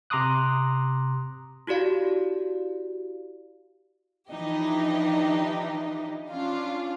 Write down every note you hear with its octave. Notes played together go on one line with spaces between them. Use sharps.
C3 A#5 C6 D6 D#6 F#6
E4 F#4 G4 D5 F5
E3 F3 D4 D#4 G4 D#5
C#4 D4 F4 F5